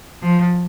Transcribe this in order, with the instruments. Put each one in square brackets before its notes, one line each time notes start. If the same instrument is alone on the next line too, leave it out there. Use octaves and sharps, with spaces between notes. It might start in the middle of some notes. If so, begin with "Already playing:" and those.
[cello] F3